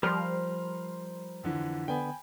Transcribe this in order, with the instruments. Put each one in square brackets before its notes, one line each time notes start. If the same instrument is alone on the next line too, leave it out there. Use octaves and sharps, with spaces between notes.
[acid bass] F3 [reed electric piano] G3 [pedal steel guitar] A#4 C5 F6 [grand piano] B5 C6
[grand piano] F2 D3 E3
[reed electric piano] D3 B3 [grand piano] G5 G#5 B5